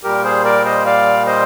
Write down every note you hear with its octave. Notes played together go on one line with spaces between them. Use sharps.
A#2 G3 G4 A#4
G#4 C5
A#4 D5
C5 D#5
D5 F5
C5 D#5